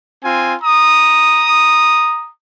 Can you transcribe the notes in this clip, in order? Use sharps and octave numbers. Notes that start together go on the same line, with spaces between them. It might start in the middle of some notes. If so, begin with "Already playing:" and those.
C4 F4 G#5
A#5 D#6